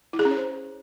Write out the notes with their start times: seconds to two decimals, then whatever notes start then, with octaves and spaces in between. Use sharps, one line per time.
0.13 E4
0.19 G#4
0.25 C#4
0.31 C#5
0.37 C5